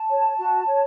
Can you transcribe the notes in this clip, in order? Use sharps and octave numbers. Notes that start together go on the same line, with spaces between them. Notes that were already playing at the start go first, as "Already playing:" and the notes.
Already playing: A5
C#5
F#4
C#5